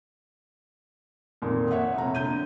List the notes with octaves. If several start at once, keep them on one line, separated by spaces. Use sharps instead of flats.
F2 A#2 D#3
C#5 E5 F#5
F1 A#5
D3 G6 D#7